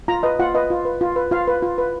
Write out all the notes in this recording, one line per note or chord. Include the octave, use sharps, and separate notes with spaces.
F4 A#5
B4 D#5
F4 F#5
B4 D#5
F4
B4
F4
B4
F4 F5
B4
F4
B4